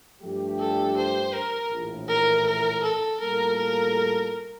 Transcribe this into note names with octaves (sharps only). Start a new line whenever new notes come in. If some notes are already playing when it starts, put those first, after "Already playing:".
G2 F3 A3 D4 G4
A4
C5
A#4
A#1 A2 E3
A#4
A#4
A4
A2 G3 A#3 F4 A4 A#4
A#4